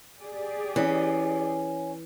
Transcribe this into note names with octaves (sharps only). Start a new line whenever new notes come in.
G4 G#4 D5
E3 C#4